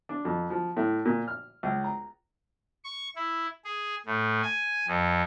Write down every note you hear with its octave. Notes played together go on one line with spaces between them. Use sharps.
D4
F2
F3
A2
A#2
F6
C#2
A#5
C#6
E4
G#4
A2
G#5
F2